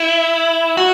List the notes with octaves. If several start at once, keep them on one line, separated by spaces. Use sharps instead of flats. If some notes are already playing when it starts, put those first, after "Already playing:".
Already playing: E4
F#4